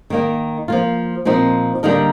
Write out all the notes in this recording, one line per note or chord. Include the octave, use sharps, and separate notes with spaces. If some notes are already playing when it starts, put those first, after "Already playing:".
D#3 A#3 D#4
F3 A#3 F4
A#2 F3 C4 D#4
D3 G3 A#3 D#4 A#4